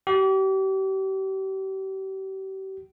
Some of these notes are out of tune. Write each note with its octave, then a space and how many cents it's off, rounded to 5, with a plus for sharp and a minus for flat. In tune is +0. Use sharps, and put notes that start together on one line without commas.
G4 -35